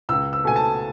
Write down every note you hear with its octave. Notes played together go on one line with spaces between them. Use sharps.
C#2 E6
E6
B2 A3 G#5
A5